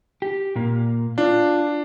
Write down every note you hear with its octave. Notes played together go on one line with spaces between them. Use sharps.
G4
A#2 A#3
D4 F4